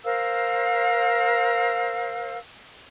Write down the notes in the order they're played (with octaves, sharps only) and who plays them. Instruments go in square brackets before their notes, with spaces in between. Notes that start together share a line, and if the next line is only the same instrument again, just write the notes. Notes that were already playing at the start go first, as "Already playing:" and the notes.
[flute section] A#4 C5 F5 E6